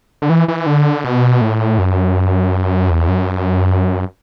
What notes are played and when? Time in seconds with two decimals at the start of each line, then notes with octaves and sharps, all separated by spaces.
0.22 D3
0.30 E3
0.48 E3
0.66 D3
1.04 B2
1.41 A2
1.79 F#2
2.90 E2
3.08 F#2